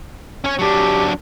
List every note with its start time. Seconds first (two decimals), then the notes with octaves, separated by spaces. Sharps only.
0.44 C#4 C#5
0.59 F#3 D4 G4